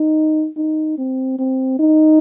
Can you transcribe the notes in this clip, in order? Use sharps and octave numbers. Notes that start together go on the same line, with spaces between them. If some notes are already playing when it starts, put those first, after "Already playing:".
Already playing: D#4
D#4
C4
C4
D#4